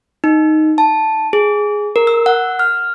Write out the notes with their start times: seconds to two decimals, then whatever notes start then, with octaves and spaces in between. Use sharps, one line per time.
0.24 D#4
0.78 A5
1.33 G#4
1.96 A#4
2.07 E6
2.26 F#5
2.59 F6